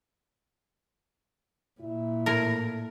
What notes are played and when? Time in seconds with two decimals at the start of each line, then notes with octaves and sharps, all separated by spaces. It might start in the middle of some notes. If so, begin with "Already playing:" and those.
1.80 A#2 E4
2.26 A2 A#4